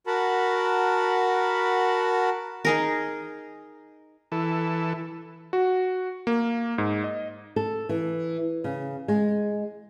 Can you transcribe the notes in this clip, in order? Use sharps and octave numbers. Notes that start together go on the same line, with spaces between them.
F#4 A#4 F#5 A5 B5
D#4 G#4 A#4
E3 A4
F#4
A#3
G#2
D#5
A4
E3
C#3
G#3